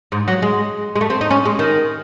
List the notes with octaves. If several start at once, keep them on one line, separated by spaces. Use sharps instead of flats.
G#2
F#3
G#3
G#3
A3
C4
D#4
C#4
G#3
D#3